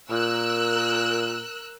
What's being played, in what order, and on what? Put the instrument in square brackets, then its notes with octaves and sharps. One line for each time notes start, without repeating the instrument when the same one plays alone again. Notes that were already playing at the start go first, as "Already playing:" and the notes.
[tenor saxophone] A#2 [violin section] A#4 E6 F#6